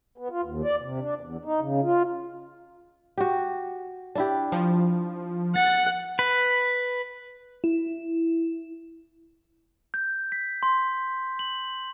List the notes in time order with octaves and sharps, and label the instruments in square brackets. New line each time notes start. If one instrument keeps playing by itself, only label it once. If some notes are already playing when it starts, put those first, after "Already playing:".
[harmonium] B3
F4
D#2
D5
C3
D4
E2
D#4
C#3
F4
[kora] F#4 G4
D4 E4 G4
[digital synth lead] F3
[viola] F#5 [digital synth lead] A6
[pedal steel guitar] B4
[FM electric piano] E4
[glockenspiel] G6
B6
C6
F#7